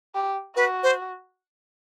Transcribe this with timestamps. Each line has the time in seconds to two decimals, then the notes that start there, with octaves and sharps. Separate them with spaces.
0.15 G4
0.56 F#4 B4
0.83 C5